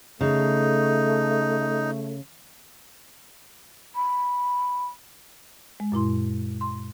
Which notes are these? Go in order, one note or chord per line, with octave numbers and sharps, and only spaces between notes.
C#3 A3 D#4
B5
G#3
F#2 A#2 E4 C6
C6